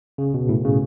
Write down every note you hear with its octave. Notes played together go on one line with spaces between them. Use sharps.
C#3
B2
A2
C#3